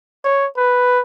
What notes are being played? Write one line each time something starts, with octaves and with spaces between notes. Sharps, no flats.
C#5
B4